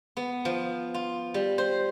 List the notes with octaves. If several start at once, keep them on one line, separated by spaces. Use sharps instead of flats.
B3
F3
F4
G3
C5